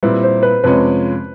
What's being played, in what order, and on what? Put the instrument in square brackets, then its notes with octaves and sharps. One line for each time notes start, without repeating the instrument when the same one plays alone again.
[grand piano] A#2 G3 C4 E4 [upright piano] B4
[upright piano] C5
B4
[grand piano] F2 C3 F3 G#3 C#4 [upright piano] B4